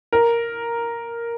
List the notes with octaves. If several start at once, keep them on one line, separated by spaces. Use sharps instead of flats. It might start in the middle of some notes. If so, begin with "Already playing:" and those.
A#4